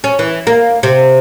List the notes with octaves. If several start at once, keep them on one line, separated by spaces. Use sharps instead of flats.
C#4
E3
A#3
C3